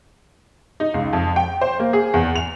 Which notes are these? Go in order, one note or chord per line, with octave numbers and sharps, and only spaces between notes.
D#4
C#2
F2
G5
C5
A#3
G#4
E2
F7